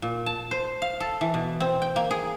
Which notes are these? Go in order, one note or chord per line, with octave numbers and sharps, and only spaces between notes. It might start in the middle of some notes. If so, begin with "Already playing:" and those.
A#2
A5
C5
F5
A4
E3
B2
C4
G5
A#3
G#4